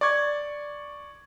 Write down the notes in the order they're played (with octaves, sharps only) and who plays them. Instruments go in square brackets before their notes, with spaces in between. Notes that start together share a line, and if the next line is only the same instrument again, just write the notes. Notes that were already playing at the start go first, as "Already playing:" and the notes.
[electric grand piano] D5 C#6 G#6